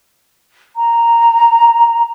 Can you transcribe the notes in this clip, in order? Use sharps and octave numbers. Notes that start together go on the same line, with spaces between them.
A#5